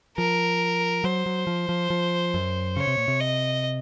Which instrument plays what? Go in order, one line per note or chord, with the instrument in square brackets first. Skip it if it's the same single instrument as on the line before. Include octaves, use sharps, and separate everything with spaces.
[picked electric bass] F3 [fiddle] A#4
[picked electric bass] F#3 [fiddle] C5
[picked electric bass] F#3
F3
F3
F3
F#2
[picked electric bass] C#3 [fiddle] C#5
[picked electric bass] C3
A#2
C3
[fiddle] D#5